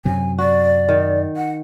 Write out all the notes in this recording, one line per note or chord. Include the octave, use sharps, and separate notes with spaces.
F#2 C3 F#3 G#5
F#4 D5
D#3
F#5